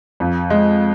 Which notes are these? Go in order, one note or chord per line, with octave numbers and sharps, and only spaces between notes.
F2
G#3